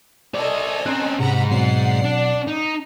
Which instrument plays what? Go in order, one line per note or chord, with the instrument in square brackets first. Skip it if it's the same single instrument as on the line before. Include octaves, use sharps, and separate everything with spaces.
[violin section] A4 D#5 G#5 [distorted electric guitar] C5 D5
[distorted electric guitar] C4 C#4 [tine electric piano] A#5 F#6
[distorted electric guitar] G#2 [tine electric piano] C3 [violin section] F#5 A#5 B5
[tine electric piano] B2 F#3 C4 [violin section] D5 F#5 C7
[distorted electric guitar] D4
D#4